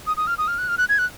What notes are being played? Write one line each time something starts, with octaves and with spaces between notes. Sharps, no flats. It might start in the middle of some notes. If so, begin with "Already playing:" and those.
D#6
D#6
F6
D#6
F6
F#6
F6
F#6
G#6
F#6